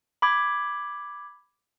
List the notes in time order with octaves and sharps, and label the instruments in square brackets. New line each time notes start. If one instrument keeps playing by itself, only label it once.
[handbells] B5 D6 G#6